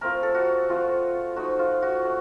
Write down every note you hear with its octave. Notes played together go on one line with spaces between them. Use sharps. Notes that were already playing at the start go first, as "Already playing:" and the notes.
A3 C4 F4 A#4
A4
F#4
F3 A3 C4 F4
F3 A3 D#4 F#4
F4
F#4
A3